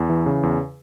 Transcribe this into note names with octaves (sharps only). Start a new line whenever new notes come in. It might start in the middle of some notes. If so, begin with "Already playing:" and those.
Already playing: E2
E3
C#3
E2